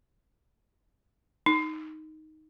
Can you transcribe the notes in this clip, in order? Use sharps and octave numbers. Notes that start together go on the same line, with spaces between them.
D#4